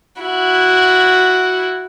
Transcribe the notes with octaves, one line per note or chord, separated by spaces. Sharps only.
E4 F#4